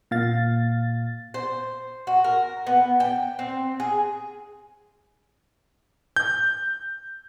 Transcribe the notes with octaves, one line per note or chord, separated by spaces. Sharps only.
A#2 F5 A6
C5
F#4
A#4
B3
G5
C4
G#4
G6